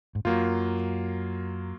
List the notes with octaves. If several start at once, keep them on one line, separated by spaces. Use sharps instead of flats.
G#2
F#2 F#3 A#3 F4